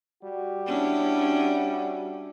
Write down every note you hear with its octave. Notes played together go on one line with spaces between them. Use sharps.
G3 F#4
C#4 D4 E4